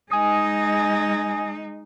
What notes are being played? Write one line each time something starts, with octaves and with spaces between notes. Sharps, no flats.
G#3 D#4 G#5 D#6